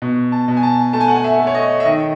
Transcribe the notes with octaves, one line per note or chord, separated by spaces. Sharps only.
B2
A5
B2
G#5
A5
A3 A5
G#5
F#5
G#5
E5
A3
C#5
D#5
E5
D#3 D#5